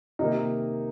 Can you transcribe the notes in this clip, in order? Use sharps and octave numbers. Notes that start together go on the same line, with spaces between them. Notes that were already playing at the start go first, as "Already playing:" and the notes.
C3 D#3 A#3 D#4